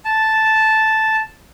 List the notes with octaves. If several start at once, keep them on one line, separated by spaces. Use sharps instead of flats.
A5